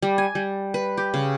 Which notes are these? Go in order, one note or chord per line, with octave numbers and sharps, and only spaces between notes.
G3
G#5
G3
B4
G4
C#3